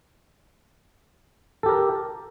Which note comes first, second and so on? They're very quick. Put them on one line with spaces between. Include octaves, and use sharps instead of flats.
A4 G4 A#4